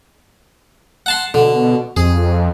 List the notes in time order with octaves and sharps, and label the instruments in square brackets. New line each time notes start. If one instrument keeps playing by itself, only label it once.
[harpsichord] F#5 A5 C6
[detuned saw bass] B2 [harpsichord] D3
[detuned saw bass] F2 [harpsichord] G#4